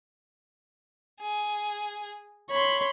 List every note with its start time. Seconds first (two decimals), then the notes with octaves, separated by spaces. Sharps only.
1.21 G#4
2.51 C#5 B5 C6